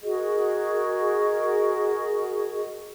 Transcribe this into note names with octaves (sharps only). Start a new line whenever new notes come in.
F#4 G#4 A#4 D#5